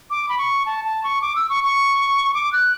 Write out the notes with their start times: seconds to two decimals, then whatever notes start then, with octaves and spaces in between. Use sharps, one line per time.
0.10 D6
0.29 B5
0.38 C#6
0.66 A5
0.85 A5
1.04 C#6
1.22 D6
1.36 E6
1.49 C#6
1.64 C#6
2.34 D6
2.53 F#6